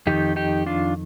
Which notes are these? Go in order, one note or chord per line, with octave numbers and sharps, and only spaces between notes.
F2 D#3 D#4 G4
D#4 G4
D4 F4